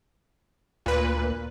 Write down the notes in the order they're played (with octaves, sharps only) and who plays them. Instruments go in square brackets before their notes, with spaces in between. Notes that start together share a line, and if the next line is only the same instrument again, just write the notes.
[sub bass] D2 [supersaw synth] A#2 B4